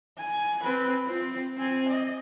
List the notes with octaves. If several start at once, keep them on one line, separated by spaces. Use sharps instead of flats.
G#5
C4 B4
C4 F4
C4 G#5
D#5